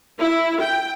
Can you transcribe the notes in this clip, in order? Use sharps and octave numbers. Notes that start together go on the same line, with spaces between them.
E4
G5